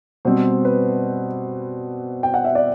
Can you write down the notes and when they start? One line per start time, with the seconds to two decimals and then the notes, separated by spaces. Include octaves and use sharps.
0.25 B2 G3 C4 C5
0.65 B4
2.23 G5
2.34 F#5
2.44 E5
2.55 D5